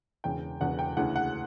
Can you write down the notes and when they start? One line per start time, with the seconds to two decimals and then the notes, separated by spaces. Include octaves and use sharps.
0.24 E1 E2 C#3 G5
0.61 E1 E2 C#3 F#5
0.79 G5
0.97 D2 C#3 E3 F#5
1.16 F#5